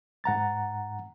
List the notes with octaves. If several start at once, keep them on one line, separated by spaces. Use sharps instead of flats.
G#2 F#5 A#5 A6